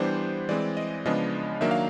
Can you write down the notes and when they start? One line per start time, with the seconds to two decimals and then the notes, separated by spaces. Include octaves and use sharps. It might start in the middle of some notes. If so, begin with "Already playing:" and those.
Already playing: E3 G3 B3 D4 C5
0.49 E3 G#3 C4 D5
0.77 D#5
1.05 C#3 F3 G#3 B3 D4 D#5
1.61 D#3 F#3 A#3 D4 E5
1.71 F5